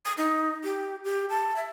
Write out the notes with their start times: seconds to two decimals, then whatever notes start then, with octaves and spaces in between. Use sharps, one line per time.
0.06 D#6
0.17 D#4
0.64 G4
1.04 G4
1.29 A5
1.56 E5